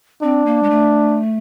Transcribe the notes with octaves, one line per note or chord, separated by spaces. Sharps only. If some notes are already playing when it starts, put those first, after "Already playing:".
C4 D4
A#3
G#3
A3